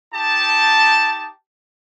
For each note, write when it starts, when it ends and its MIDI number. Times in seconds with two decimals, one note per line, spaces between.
0.14 1.30 63
0.14 1.30 67
0.14 1.30 81